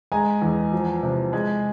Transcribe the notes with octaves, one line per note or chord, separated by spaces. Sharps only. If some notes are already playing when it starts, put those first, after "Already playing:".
G#3 G#5 A#5
E2
F3
C3
G#3